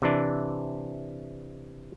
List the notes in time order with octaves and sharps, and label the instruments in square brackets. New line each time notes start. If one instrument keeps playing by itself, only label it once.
[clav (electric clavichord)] C3 E3 D4